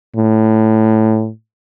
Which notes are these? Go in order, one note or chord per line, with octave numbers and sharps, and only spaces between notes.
A2